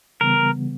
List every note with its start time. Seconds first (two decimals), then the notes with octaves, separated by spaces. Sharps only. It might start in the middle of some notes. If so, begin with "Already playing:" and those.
0.21 C#3 E3 G3 B3 A#4